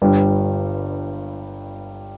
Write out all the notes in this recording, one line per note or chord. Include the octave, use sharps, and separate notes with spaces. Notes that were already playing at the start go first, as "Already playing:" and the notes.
G1 G2 G3